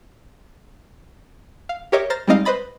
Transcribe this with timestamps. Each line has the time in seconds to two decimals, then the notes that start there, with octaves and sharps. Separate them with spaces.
1.69 F5
1.92 G4 A#4 C#5 D#5 E5 D6
2.10 C5 A#5 F6 A6 A#6
2.27 G3 G#3 C4 D#4 D#5 F5
2.45 B4 C5 D#5 B5 A6